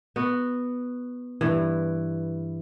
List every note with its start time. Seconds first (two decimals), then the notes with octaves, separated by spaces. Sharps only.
0.16 B3 F#4
1.41 G2 E3